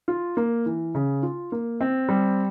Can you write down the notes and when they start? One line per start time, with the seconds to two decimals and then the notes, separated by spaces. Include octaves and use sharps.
0.08 F4
0.37 A#3
0.66 E3
0.95 C#3
1.23 F4
1.52 A#3
1.81 C4
2.09 G3